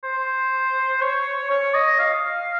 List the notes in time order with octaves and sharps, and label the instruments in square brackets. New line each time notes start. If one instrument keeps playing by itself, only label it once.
[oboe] C5
C#5
C#5
D#5
F5